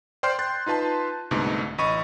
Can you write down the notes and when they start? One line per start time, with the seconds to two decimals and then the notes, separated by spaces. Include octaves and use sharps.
0.23 C5 D5 G5 C6 F6 G6
0.39 C6 F#6 A6
0.66 D#4 F4 B4 A5 C6
1.31 C2 G#2 B2 D3 A3
1.78 A1 D#5 B5 C#6 D#7